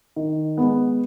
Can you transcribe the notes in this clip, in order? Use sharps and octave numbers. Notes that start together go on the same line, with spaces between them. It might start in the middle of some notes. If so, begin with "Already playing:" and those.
D#3
G#3 B3